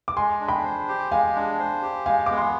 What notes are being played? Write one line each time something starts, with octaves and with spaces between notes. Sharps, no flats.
D6
G#3 G#5 C6
D4
G5 B5
C5
G4
G#3 F5 G#5
D4
C5
G4
G#3 F5 G#5
B3 D6
G#5 C6